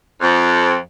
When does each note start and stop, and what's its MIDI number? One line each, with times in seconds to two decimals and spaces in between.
0.21 0.75 41